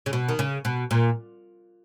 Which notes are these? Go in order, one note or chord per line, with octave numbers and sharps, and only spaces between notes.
C#3
B2
D#3
C#3
B2
A#2